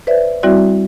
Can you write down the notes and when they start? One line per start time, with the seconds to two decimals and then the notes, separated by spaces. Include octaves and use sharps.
0.07 B4 C5 D5 E5
0.43 G3 C4 E4 F#4 D5 E5